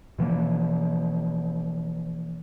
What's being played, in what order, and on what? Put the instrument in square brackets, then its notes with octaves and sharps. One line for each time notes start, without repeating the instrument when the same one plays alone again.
[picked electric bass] B2 E3 F3 A#3